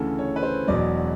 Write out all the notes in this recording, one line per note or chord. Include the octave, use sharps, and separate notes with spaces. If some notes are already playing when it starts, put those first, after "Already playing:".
Already playing: D2 C#3 E3 A4
C#5
B4
C5
E1 E2 B2 F#3 D5